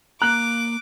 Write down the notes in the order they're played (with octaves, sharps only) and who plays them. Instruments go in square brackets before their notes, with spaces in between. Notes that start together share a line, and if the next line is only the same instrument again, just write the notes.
[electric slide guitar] A#3 A#5 [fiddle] D6 [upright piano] F#6